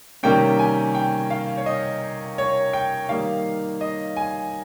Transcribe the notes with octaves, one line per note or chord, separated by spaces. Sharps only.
C3 D#3 G3 A#3 C#4 G5
G#5
G5
F5
C#5
D#5
C#5
G5
D#3 G3 A#3 D#4 F5
D#5
G#5